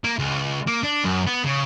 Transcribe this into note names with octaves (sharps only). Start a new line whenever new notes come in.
A#3
C#2
A#3
D4
F#2
B3
C#3